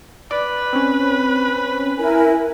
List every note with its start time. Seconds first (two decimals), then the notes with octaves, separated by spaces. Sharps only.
0.31 B4 D5
0.73 C4 C#4
1.98 E4 A#4 G#5